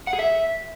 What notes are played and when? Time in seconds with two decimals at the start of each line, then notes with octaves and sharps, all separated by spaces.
0.07 F#5
0.13 G#4
0.19 E5